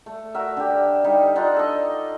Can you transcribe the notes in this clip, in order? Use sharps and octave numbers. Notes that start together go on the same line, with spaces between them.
A3
F#4 A#4 E5
D3 G4
G3 D#4
D4 D#4 F4 F#5
A4 D#5